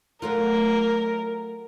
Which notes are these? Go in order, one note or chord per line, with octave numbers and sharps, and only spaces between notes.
F#3 A3 F4 A#4